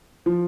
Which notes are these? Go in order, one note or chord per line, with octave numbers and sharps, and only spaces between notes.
F3